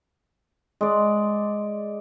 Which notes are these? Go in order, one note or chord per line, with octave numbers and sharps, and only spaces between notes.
G#3 D5